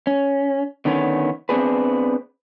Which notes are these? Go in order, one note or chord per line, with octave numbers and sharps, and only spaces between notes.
C#4
D3 D#3 B3 C#4
B3 C4 D4 G#4 B4